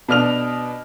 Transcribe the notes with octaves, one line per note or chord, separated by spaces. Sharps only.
B2 D4 F6 F7